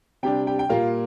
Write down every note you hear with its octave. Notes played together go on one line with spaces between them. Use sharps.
C3 G3 D4 G4 G5
G4 G5
G5
A#2 G3 A#3 F4 F5